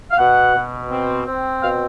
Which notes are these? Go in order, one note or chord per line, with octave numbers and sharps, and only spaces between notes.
F5
B2 F#5
B2
C4
C4
B2 F5